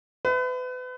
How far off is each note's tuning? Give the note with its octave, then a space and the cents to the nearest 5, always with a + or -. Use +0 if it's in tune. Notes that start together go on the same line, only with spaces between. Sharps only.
B4 +35 E5 +0